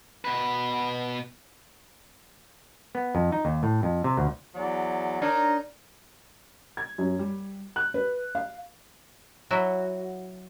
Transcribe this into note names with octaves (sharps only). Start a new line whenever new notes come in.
B2 B4
B3
F2
D#4
D#2
A2
F2
C3
D2
E2 F#3 D5
D4 D#4 A#4 C#5
G#6
F#2
G3
F#6
B4
F5
F#3 E4 F#4